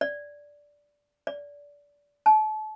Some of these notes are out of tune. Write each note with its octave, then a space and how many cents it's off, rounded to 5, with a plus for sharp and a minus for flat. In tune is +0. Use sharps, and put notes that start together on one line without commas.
D5 -10
D5 -25
A5 -35